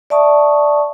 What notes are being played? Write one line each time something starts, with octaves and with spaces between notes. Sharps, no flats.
D5 E5 A5 C#6 D#6